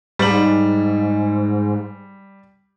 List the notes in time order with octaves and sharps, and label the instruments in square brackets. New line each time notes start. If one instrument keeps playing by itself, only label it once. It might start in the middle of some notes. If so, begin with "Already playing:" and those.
[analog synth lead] G#2 [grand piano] G3 F#7